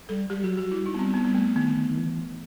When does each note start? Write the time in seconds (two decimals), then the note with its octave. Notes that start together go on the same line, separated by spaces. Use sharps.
0.09 G3 A4
0.30 G3 G4
0.43 F#3 F#4
0.57 G3 F#4
0.72 E4
0.86 D#4
0.94 B3
0.99 C4
1.14 B3
1.25 B3
1.35 A3
1.56 D#3 B3
1.76 D#3
1.89 D#3
1.97 E3